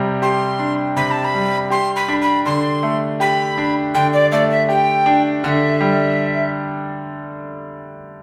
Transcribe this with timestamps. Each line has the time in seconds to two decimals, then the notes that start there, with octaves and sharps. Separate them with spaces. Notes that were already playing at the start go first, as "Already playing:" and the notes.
Already playing: C3 G3
0.22 G4 C6
0.59 D4
0.96 C3 B5
1.10 A5
1.24 B5
1.34 G3
1.70 G4 C6
1.95 B5
2.08 D4
2.21 B5
2.45 D3 C6
2.83 A3
3.20 G4 B5
3.58 D4
3.94 D3 G5
4.13 D5
4.31 A3 D5
4.50 E5
4.69 G4 G5
5.06 D4
5.43 D3 E5 F#5
5.80 G3